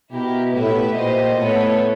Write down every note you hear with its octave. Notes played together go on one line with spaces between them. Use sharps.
B2 E4 G4 A#4
A2 B3 E4 G4 B4 E5
A#2 G4 C5 D#5
A2 B3 E4 A4 C#5